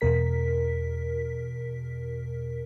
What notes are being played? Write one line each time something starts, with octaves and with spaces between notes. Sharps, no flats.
E2 B2 A#4 B6